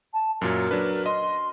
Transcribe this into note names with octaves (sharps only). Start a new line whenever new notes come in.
A5
F#2 A#2 F#3 A#4
F#3 D4 B4
D#5 C6